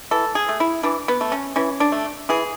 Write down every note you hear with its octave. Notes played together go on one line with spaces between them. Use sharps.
E3 A4
G#4
A3
E4
E3 D4
B3
A3
C#4
E3 C#4
D4
A3
E3 G#4